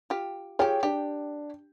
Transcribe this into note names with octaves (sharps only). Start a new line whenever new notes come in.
F4 G4
F4 G4 G#4 C#5 G5
D4 G4